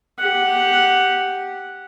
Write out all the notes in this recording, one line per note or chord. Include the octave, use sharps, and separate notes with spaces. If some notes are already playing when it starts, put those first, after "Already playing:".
G4 F#5